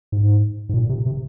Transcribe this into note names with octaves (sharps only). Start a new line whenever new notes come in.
G#2
G#2
A#2
C3
C3